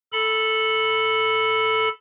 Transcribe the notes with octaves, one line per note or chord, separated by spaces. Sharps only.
A4 B5